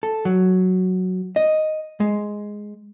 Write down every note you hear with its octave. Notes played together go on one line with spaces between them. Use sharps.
A4
F#3
D#5
G#3